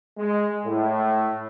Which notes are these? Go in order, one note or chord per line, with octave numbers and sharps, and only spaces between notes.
G#3
A2